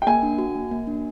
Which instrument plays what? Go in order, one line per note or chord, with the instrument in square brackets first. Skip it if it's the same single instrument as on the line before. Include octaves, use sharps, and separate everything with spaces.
[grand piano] G5
[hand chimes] A#3 [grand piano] G#5
[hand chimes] D4
F#4
A#3
A#3
D4